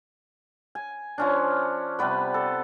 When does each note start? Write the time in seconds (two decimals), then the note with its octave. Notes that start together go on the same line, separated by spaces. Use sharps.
0.75 G#5
1.18 F3 C#4 D4
1.99 C3 G3 B3 B4
2.34 A4